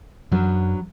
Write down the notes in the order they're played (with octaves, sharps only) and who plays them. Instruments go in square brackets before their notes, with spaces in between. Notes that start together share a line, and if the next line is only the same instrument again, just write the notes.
[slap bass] F#2 [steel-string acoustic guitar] F#3 D4 B4